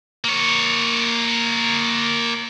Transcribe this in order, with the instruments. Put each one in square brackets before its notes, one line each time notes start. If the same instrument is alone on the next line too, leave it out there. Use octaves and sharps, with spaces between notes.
[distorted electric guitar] A#3 C#5